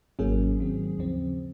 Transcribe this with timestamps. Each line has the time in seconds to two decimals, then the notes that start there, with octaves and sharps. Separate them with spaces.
0.19 G#1 G#2 F#3 A#3 C#4 G#4
0.59 G#2 D#3 F#3 C4
0.98 D#2 C#3 F3 C4